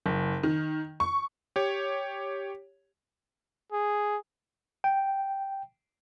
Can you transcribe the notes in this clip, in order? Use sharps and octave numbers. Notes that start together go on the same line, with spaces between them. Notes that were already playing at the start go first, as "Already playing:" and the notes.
F#1
D#3
C#6
G4 C#5
G#4
G5